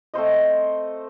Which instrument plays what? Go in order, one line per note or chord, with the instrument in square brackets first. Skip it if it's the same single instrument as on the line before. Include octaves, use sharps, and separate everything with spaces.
[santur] A3 C4 C5 D#5